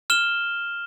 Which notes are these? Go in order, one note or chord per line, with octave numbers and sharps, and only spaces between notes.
F6 E7 G7